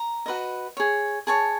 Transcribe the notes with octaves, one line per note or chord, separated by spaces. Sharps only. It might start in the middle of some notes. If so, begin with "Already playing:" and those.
Already playing: A#5
F#4 B4 D#5
G#4 C#5
G#4 C#5 A5